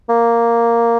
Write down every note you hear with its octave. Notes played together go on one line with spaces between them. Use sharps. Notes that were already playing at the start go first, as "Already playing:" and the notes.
A#3